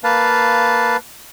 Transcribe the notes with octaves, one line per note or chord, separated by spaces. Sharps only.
A#3 B4 F5 A5